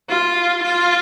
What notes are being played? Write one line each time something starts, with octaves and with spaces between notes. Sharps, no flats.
F4
F4